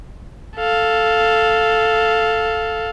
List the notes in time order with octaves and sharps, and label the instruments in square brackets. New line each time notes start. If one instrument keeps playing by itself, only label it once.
[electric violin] A4 F5